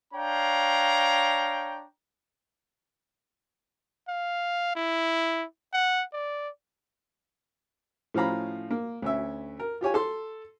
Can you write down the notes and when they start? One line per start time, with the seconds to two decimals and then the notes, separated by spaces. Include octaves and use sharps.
0.14 D4 C#5 F5 G5 A#5
4.09 F5
4.76 E4
5.73 F#5
6.13 D5
8.14 A2 F3 C#4 F5 A#5 B5
8.71 A#3
9.02 D2 C#4 E5
9.60 A#4
9.81 F4 G4 C#5 G#5
9.94 A4 C6